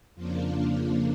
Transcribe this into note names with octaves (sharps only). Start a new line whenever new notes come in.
F2 C#3 F3 A#3 D4 F4